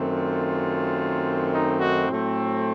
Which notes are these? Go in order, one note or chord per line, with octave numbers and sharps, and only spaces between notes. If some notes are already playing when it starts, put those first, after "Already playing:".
Already playing: F#2 D#3 A3 C4
F4
D#4
D#4 F#4
A2 F#3 A3 C4